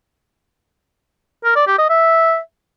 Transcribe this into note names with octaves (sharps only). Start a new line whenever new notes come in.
A#4
D5
G4
D#5
E5